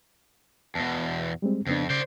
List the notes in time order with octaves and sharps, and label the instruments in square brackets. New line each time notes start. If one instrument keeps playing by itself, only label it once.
[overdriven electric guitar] E2 B2 [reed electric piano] A5
[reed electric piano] G3 G#3 C4
[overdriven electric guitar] F2 [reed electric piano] C#3 B3 D4
[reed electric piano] C#3 [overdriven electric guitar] C5 D5